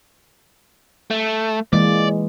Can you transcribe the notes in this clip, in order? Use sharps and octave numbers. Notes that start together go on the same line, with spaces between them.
A3
E3 G#3 A#3 D5